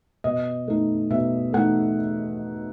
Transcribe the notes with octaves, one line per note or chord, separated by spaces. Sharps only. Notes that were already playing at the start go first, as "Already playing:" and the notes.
B2 D#5
A3 D#4
B2 E5
A3 D#4 F#5